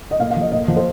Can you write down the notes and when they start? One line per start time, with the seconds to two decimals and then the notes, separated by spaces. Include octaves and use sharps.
0.11 D#5
0.20 A#2 F5
0.30 F5
0.36 F3 D#5
0.52 A#2 D#5
0.68 F3
0.76 C5